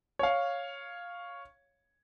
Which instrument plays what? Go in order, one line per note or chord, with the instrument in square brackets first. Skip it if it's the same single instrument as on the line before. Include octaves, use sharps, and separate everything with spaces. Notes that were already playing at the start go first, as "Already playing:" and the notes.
[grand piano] C#5 F5